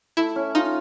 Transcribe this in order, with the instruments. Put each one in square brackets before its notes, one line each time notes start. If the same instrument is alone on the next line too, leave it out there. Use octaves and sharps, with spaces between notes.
[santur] A3 [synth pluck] E4
[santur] C#4
[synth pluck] D#4 [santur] F4